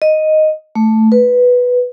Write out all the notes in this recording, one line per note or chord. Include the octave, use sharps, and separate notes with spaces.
D#5
A3
B4